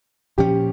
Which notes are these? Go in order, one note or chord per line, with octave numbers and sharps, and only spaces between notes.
A#2 F3 C#4 G4